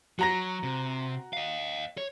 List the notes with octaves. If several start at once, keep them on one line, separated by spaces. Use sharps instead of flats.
F#3 F#4 A#5 A#6
C3
D#5 F5
C#5